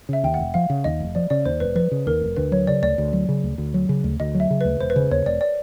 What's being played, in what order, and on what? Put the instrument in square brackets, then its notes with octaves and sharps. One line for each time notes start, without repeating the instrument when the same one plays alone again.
[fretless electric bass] C#3 [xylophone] E5
[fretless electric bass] D#2 [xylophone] G5
[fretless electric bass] F1 [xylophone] F#5
[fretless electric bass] F3 [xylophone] F5
[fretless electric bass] C#3
[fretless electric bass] D#2 [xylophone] D#5
[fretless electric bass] F1
[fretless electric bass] F3 [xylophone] D5
[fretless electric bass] C#3 [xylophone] D5
[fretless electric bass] D#2 [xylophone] C5
[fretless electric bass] F1 [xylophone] B4
[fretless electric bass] F3 [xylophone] B4
[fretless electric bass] C#3
[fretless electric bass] D#2 [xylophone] A#4
[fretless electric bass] F1
[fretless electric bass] D2 [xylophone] B4
[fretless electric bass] F#3 [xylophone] C#5
[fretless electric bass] C#3 [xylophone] D5
[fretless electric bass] D2 [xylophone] D5
[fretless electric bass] D2
F#3
C#3
D2
D2
F#3
C#3
D2
[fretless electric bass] D2 [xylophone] D#5
[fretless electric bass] F#3
[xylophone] E5
[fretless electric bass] C#3
[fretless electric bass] D2 [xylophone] B4
[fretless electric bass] E1 [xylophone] C5
[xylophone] B4
[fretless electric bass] C#3 [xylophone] C5
[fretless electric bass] D#2 [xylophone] C#5
[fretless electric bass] E1 [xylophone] D5
[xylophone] D5